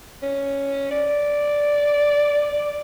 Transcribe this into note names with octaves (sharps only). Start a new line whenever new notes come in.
C#4
D5